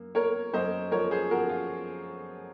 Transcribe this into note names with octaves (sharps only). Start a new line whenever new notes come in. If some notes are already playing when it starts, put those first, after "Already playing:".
Already playing: F#2 A#3
A#3 A#4 C#5
F#2 C5 D#5
F3 A#4 C#5
G#4 C5
F3 F#4 A#4
F4